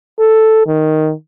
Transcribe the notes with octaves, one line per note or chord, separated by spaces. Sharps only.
A4
D#3